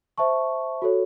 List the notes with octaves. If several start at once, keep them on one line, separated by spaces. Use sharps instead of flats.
C5 E5 A5 C#6
F#4 A4 C#5